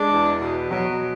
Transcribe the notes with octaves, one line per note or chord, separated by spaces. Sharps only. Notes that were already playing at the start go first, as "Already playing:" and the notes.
Already playing: G#3 D4
E2
B2
B2 F#3